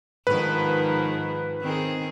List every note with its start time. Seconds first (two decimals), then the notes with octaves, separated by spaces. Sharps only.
0.27 G#2 D#3 F3 B4
1.61 D#3 C4 G#4